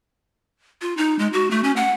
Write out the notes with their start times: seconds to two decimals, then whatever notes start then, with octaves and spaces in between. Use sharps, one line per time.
0.82 F4
0.97 D#4
1.19 G#3
1.33 F#4
1.51 A3
1.64 C#4
1.76 F#5